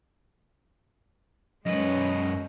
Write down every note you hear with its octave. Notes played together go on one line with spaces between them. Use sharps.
F#2 G#3 C#4 B4 D#5